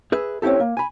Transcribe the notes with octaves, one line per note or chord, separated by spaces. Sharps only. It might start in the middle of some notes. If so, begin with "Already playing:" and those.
G#4 B4 E5
C4 C#4 E4 G4 A4
A#3
G#5 B5